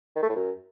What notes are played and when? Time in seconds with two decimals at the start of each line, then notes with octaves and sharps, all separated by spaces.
0.16 D#3
0.23 A3
0.29 A2
0.36 F#2